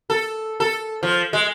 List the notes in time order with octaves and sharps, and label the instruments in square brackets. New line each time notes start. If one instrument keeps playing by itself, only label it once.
[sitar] A4
A4
F3
G#3